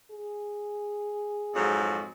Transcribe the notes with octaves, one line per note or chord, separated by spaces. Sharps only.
G#4
F2 G#2 F#3